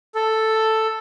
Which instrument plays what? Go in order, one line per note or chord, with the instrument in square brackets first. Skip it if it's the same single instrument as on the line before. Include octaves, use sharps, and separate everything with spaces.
[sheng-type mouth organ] A4